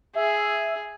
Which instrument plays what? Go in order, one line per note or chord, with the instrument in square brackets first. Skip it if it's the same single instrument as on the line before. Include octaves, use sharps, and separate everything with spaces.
[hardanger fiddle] G#4 [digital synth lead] E5